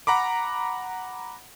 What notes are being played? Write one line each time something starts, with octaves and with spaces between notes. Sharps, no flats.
F#5 A#5 B5 D6